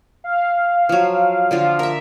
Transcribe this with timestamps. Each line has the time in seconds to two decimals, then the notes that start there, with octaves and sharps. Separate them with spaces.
0.24 F5
0.89 F3 F#3
1.51 D3 F3 F4
1.79 A#4 E5